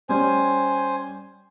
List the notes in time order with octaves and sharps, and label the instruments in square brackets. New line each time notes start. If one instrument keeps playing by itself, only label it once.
[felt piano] G3 C#4 [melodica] C5 G#5